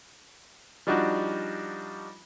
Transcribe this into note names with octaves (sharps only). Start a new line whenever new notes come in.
F3 G3 D4 D#4 F#4